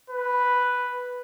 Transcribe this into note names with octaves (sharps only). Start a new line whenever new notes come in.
B4